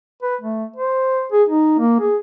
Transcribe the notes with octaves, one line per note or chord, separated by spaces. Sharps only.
B4
A3
C5
G#4
D#4
A#3
G#4